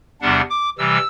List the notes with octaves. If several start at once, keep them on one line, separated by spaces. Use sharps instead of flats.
E2 C3 G3 B3 D4 F#5
D6
C3 E3 G3 E6